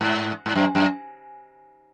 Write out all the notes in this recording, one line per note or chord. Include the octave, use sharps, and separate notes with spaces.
G#2
G#2
F#2
F#2